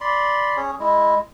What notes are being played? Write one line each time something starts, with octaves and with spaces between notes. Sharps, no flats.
D5 B5 C6
C#4 G#4 C#5
G#3 E4